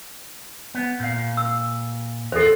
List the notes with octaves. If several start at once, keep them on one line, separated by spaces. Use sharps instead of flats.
B3
A#2 F5
E6
E2 F4 A4 C5